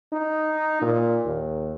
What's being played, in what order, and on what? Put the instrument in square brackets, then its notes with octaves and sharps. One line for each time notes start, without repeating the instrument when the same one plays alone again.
[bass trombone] D#4
A#2
D#2